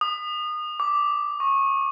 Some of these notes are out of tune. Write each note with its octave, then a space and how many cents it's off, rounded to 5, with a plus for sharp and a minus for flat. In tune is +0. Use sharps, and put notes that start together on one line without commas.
D#6 -30
D6 -10
C#6 -20